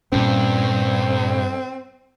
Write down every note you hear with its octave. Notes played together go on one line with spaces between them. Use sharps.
G2 A#2 C4 C#4